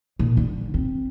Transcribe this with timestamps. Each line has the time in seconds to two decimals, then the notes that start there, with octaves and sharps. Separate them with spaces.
0.19 A#2
0.37 D3
0.74 C4